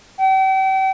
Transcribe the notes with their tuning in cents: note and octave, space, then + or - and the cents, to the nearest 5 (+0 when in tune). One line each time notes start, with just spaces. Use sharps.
G5 -40